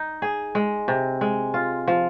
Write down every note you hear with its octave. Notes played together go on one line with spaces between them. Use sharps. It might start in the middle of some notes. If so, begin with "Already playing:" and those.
Already playing: D#4
G#4
G#3
C3
G#3
F4
F3